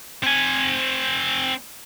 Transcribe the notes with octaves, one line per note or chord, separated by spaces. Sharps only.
C4 G#5